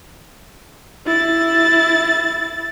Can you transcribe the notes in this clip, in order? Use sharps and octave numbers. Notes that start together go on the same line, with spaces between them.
E4 A6